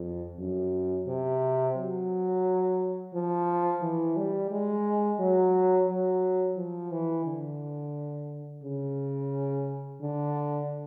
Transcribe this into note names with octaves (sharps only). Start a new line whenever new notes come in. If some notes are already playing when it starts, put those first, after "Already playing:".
Already playing: F2
F#2
C3
F#3
F3
E3
G3
G#3
F#3
F#3
F3
E3
D3
C#3
D3